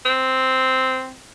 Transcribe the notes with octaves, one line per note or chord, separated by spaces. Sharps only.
C4